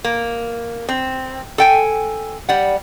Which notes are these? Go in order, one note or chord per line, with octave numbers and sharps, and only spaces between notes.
A#3
C4
A4 G5 G#5
G3 F#5